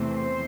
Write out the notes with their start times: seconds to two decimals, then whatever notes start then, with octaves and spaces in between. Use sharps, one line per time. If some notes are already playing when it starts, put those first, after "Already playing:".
Already playing: E2 C3 E3 A3 C4
0.12 C5